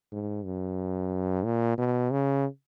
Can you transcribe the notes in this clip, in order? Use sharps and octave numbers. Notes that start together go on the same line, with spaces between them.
G#2
F#2
A#2
B2
C#3